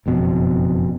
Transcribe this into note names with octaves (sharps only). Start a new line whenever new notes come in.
F#1 F2 B2